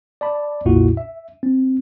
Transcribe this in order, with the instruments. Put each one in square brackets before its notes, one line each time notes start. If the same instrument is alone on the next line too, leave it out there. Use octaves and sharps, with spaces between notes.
[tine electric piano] D5 A5 B5
B1 F2 A#2 E4 F#4
E5
C4